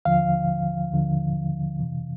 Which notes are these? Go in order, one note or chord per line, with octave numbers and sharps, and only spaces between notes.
D#2 D3 F3 F5
D#2 D3 F3
F2 C3 E3